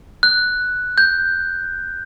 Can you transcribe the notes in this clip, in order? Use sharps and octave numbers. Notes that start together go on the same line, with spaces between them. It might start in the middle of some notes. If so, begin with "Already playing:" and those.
F#6
G6